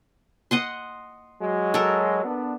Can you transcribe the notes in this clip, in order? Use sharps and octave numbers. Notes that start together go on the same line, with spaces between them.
D#5 F#5 C6
F#3 G#3
A4 A#4
B3 D4